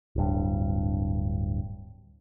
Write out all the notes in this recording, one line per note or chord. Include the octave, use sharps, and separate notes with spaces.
D1 G2